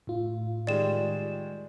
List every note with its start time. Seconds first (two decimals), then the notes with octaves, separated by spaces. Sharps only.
0.07 A2 F4
0.67 D#3 G3 G#3 D5 E7